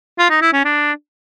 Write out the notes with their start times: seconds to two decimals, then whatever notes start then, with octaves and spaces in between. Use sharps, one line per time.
0.19 F4
0.30 D#4
0.41 E4
0.53 C#4
0.64 D4